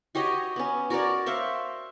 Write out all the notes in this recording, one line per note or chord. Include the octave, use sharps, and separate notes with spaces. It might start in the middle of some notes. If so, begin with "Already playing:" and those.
F#4 G4 C#5 D#5
B3 C#4
F#4 A#4 C#5 D5
C5 E5 F5 C#6